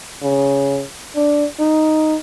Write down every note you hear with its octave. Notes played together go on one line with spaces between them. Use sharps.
C#3
D4
D#4